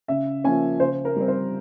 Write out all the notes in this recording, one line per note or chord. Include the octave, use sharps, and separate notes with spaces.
C#3 E5
F3 A#3 C#4 G#5
C#3 C5
A#4
G3 C4
C5